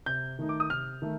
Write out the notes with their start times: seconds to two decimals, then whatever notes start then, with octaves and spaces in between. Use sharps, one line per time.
0.06 C3 G6
0.39 D#3 A3 D#4
0.49 D6
0.60 D#6
0.70 C3 F6
1.02 D#3 A3